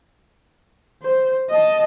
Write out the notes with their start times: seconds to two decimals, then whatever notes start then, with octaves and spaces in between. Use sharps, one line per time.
1.02 C5
1.50 D#5 A5